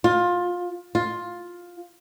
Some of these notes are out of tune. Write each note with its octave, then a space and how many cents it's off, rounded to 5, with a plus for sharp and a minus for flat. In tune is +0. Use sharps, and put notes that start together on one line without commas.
F4 +20
F4 +10